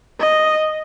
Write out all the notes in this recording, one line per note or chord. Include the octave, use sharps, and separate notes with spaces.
D#5